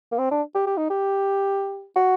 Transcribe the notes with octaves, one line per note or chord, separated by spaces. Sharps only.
A#3
C4
D4
G4
G4
D#4
G4
F#4